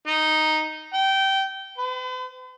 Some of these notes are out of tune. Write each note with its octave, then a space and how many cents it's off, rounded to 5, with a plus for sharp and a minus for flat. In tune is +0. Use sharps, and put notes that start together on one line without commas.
D#4 +0
G5 -20
B4 +45